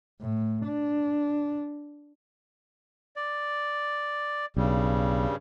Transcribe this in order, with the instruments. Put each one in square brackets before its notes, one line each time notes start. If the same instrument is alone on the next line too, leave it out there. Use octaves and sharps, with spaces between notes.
[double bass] A2
D4
[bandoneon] D5
[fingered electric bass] B1 [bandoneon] G2 C#3 G3